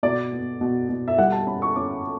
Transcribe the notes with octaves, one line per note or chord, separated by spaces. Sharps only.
B2 D5
B3
B2
B2
E5
G3 F#5
A5
C#4 B5
C#6
C#4 D6